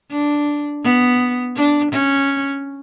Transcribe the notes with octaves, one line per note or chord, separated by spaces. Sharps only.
D4
B3
D4
C#4